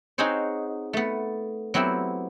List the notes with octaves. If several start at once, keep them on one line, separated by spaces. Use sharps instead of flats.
C4 D#4 F#4 G#4 C5 C#5
A3 B3
F#3 B3 C4 E4 G4